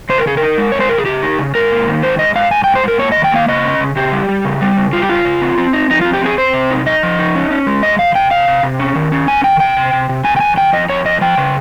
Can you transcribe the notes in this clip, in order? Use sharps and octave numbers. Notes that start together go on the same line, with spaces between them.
C#3 C5
A#4
C#3 G#4
D#4 A#4
G#3
G#3 C#5
C5
C#3 A#4
G#4
C#3 G4
D#4
C#3
G#2 A#4
A#3
D#3
G#2 C5
G#2 D#5
G#2 F5
G#2 G#5
G#2 G5
C5
G#2 A#4
A#3 C#5
D#5
D#3
G5
A#3 F5
C#3 D#5
C#4
C#3
C#3 G4
G3
G3
C#3
G3
C#3
G3 F4
G4
C#3 F4
C#3
C4
C4
D#4
F3 D#4
F4
C4
G4
C4 G#4
C4 C5
C3
D#4
D#4 D#5
F3
D#4
C#4
C#4
G#3
C3 D#5
D#3 F5
C3 G5
C3 F5
C3
C3
C#4
D#3
C#4
F2 G#5
D#3 G5
C3 G5
C3
C3
C3
C3 G#5
G5
F2 G#5
D#3 G5
F2 D#5
F2 C#5
F2 D#5
F3 G5
C#3